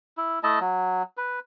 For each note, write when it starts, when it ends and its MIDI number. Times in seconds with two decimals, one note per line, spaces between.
0.17 0.39 64
0.43 0.59 57
0.43 0.59 64
0.43 0.59 75
0.43 0.59 81
0.61 1.03 54
1.17 1.39 71